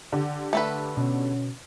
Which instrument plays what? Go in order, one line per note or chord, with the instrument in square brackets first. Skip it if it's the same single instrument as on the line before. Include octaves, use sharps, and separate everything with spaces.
[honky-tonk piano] D3 G4
[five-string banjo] A3 A4 B4
[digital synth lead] B2 [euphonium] C#4